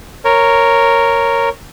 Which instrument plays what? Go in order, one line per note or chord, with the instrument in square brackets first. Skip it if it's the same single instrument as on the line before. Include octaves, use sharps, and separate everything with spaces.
[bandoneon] A#4 C#5